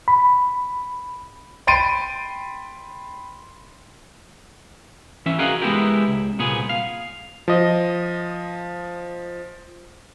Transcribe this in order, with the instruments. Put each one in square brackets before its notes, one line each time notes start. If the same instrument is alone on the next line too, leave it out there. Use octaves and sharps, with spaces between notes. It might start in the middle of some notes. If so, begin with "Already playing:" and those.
[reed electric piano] B5
[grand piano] G5 B5 C6 A6 D7 D#7
[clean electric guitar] E3 C#4 E5
F#4 G#4 A#4 D#5 F5 F#5
G#3 B3 E4 F4 G4 A#4
C#2
C2 A#2 B3 G#4
F5
[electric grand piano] F3 D#5